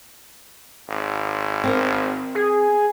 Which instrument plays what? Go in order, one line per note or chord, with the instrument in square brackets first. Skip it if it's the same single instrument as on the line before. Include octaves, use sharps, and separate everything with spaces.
[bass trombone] G#1
[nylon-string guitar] C4 A#4
[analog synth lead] G#4